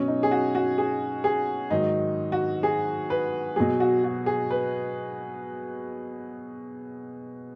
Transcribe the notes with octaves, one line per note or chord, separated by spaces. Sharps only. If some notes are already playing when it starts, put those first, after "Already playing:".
Already playing: B2 F#3 C#4
D#4
G#4
F#4
F#4
G#4
G#4
G#2 D#3 F#3 D#4
F#4
G#4
B4
B2 F#3 G#4
F#4
F#4
G#4
B4